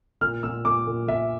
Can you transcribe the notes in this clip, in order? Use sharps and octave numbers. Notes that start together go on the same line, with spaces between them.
A#2 F6
A#2 E6
A#2 D6
A#2
A#2 E5